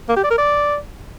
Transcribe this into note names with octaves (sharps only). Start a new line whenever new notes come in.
A#3
G4
D5
A#4
D5